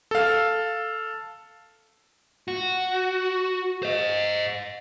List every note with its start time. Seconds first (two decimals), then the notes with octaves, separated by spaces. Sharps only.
0.11 A4 F5
2.48 F#4
3.83 C5 D#5